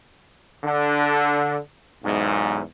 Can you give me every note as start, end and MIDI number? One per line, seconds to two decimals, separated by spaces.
0.64 1.58 50
2.04 2.61 35
2.04 2.61 40
2.04 2.61 44